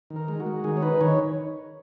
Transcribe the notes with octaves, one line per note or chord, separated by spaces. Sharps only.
D#3
A#4
G#3
F#4
G#3
D#3 G#4
C#5
D#4 B4
D#3 C#5